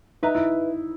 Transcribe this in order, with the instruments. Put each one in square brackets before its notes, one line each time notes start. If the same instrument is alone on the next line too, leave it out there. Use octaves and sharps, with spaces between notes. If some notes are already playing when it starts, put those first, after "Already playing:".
[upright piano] D#4 [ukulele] B4 E5 A#5
[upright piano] E4